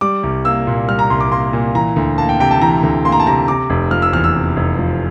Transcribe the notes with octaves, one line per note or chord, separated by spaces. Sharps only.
G3 D6
C2
A#3 E6
A#2
G3 F6
A#5
C2 C6
D6
A#3 C6
A#2
E3 A#5
D2
A#3 A5
G5
C3 G5
A5
E3 A#5
D2
A#3 C6
A#5
A5
C3 A#5
C3 D6
F1
F3 F6
E6
E2 F6
E6
C3
F1
F3